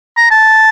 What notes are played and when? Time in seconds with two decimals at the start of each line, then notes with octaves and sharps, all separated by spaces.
0.17 A#5
0.31 A5